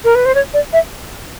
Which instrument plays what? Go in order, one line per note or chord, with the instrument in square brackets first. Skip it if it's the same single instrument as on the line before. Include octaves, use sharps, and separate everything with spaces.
[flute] A#4
B4
C5
C#5
D5
E5